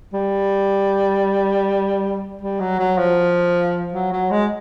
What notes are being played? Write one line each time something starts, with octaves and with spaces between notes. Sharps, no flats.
G3
G3
F#3
F#3
F3
F#3
F#3
G#3